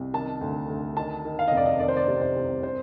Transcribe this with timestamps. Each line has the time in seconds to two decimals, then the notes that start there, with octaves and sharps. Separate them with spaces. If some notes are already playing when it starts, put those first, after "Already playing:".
Already playing: C2
0.13 D#3 A5
0.41 D2
0.69 D2
0.97 D#3 A5
1.25 D#3
1.39 F5
1.48 F1 D#5
1.57 D5
1.66 D#5
1.80 D#3 D5
1.88 C5
1.97 D5
2.08 C3
2.21 C5
2.36 C2
2.63 C5